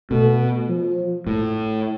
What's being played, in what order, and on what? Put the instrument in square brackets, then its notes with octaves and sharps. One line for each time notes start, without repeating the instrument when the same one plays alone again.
[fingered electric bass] B2 [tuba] A3
[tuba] F3
[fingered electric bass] A2